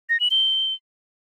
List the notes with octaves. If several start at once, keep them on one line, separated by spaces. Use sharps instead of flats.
A#6
F#7
G7